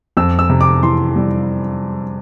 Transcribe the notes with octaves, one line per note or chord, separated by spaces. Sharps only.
F2 E6
E6
C3
D6
E3 C6
G3